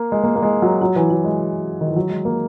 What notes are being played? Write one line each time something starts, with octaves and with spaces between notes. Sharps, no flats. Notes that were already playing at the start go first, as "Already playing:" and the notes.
Already playing: A#3
G#3
A#3
A#3
G#3
F#3
F#3
E3
F#3
G#3
D#3
E3
F#3
G#3
A#3